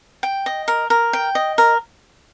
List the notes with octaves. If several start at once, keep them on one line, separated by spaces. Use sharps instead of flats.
G5
D#5
A#4
A#4
G5
D#5
A#4